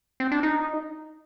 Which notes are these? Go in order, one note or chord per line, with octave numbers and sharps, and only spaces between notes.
C4
D4
D#4